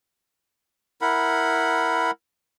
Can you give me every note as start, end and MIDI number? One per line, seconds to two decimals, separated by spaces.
1.01 2.11 64
1.01 2.11 70
1.01 2.11 78
1.01 2.11 83